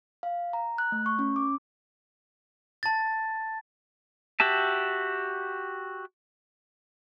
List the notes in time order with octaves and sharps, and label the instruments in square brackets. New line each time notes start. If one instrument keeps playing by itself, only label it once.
[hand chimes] F5
A#5
F#6
A3
C#6
C#4
D6
[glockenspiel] A5 A6
[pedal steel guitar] F#4 G4 E5 A5